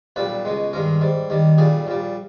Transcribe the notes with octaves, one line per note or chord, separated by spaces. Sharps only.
B1 A#2 G3 B4
C#2 B2 G#3
G2 D#3 G#3 A#4
G#2 G3
D#2 D#3 G3
B1 A#2 G3 G#4
A#1 A#2 G3